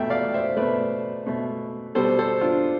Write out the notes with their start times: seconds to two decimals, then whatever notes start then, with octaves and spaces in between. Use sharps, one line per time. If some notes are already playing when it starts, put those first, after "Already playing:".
Already playing: B2 A3 E5 G5
0.10 D5 F5
0.34 C5 E5
0.57 B2 A3 B4 D5
1.26 B2 A3
1.95 B2 G3 A4 C5
2.19 A4 C5
2.41 D4 F4